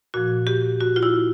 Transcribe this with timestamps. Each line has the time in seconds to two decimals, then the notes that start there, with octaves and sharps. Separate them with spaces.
0.14 A#2 F3 F#4
0.47 G4
0.81 F#4
0.96 F4
1.03 E4